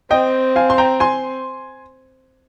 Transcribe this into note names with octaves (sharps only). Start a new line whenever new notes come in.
C4 D#5 G5
F5 G#5
C6
G5 A#5
G#5 C6